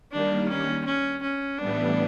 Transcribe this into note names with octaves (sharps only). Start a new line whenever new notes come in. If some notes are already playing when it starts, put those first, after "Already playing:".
D#3 G3 A#3 D4
C#4
C#4
C#4
A2 E3 G3 B3 D4